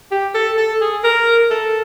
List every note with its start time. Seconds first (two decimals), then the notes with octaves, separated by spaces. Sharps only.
0.12 G4
0.34 A4
0.57 A4
0.81 G#4
1.04 A#4
1.51 A4